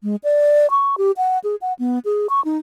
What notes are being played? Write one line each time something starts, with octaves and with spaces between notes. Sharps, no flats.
G#3
D5
C#6
G4
F#5
G#4
F#5
B3
G#4
C#6
D#4